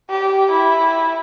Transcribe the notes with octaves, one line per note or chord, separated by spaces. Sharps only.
G4
E4